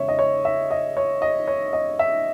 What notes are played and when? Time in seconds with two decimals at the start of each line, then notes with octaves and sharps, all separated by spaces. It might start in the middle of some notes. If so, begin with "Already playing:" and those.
Already playing: E2 C#3 G#3 C#5 E5
0.08 D#5
0.19 C#5
0.45 E5
0.70 D#5
0.97 C#5
1.22 D#5
1.48 C#5
1.73 D#5
1.99 E5